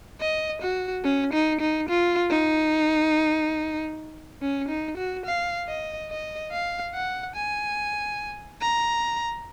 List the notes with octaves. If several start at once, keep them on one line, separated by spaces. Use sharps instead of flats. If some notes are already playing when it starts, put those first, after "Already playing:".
D#5
F#4
C#4
D#4
D#4
F4
D#4
C#4
D#4
F#4
F5
D#5
D#5
F5
F#5
G#5
A#5